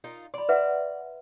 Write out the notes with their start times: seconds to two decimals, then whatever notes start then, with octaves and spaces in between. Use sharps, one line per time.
0.04 D#4 F4 A#4
0.34 D5 B5 C6
0.49 B4 E5 F#5